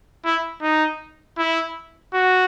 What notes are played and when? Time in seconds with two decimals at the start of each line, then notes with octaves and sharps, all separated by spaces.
0.25 E4
0.62 D#4
1.38 E4
2.13 F#4